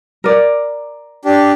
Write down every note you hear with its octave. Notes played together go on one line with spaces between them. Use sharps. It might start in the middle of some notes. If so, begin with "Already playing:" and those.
A#4 D5
D4 G4